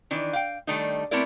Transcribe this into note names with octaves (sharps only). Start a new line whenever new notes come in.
D#3 E3 D4
F5 G5
D#3 G3 A3 D4 D#4
A3 B3 C4 E4 A#4 D5